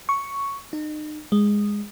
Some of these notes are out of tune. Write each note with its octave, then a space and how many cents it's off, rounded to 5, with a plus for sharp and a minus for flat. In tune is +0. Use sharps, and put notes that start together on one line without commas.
C#6 +5
D#4 -35
G#3 -10